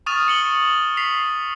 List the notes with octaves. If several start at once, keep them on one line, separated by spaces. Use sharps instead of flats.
C#6 D#6 F6 A6 D#7 F7
C#7 F#7 G7
B6 C7 F7